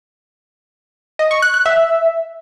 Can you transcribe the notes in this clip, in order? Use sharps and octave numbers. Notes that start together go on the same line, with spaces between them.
D#5
C#6
F#6
F#6
E5